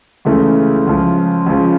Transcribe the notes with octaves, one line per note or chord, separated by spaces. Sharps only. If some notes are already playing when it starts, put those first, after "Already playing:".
C#2 C#3 E3 A3
C#2 C#3 F3
C#2 C#3 F3